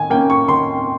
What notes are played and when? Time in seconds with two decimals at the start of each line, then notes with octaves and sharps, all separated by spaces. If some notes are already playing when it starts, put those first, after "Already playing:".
Already playing: D#3 G#5
0.10 A#3 C#4 G5
0.30 C#6
0.48 D#3 C6